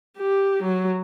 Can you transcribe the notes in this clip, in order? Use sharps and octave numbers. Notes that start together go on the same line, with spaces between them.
G4
F#3